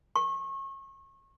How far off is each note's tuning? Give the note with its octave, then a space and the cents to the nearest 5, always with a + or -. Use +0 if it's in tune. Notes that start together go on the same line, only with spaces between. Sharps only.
C#6 -30